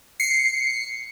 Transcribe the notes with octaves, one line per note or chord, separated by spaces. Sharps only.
C7 C#7